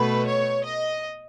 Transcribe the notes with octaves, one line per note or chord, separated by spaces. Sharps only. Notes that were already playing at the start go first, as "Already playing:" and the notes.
Already playing: B2 A3 B4
C#5
D#5